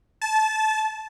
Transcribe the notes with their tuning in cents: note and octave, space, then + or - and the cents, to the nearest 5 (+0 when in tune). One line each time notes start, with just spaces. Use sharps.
A5 -20